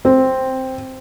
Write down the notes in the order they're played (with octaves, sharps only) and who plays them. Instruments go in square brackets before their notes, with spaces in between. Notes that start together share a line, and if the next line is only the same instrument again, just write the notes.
[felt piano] C4